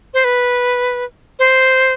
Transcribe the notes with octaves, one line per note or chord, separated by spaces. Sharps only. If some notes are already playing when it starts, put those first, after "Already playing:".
C5
B4
C5